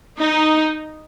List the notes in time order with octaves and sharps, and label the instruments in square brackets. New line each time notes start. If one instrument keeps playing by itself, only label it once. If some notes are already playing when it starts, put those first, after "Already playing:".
[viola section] D#4